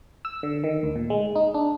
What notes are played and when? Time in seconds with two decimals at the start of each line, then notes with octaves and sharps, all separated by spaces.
0.25 E6
0.43 D3
0.64 D#3
0.83 D2
0.96 A#2
1.10 G#3
1.36 D#4
1.54 D4